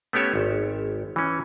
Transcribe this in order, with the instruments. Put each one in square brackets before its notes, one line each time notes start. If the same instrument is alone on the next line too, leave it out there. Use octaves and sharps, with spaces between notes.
[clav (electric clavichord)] A3 B3 C#4 G4 C#5 E5
G#1
E3 C#4